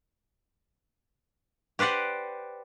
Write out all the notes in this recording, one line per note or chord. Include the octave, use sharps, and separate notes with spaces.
G4 B4 C5 D5 F#5